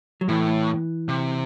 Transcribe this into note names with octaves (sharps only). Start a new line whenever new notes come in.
F#3
A2 E3
C3